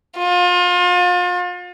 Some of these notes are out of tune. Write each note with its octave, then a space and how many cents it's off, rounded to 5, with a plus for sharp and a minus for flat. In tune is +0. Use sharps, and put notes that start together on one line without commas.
F4 +35